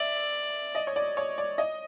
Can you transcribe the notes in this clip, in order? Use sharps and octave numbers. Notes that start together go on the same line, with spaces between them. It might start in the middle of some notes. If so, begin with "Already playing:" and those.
Already playing: D5 E5
D#5
C#5
D5
C#5
D5
D#5